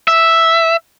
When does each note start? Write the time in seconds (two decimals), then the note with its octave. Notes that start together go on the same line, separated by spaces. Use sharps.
0.08 E5